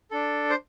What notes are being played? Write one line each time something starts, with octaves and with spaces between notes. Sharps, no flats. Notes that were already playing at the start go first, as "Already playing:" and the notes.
D4 A4
C5